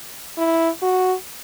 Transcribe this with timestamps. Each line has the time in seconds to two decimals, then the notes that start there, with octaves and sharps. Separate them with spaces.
0.38 E4
0.82 F#4